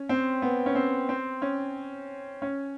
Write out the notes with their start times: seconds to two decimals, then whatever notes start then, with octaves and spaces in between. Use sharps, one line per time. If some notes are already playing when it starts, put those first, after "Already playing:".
Already playing: C#4
0.09 C4
0.42 B3
0.66 C#4
0.75 C4
1.09 C4
1.42 C#4
2.42 C#4